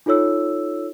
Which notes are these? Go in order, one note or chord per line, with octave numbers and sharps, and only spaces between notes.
D#4 F4 A4 C#5 E6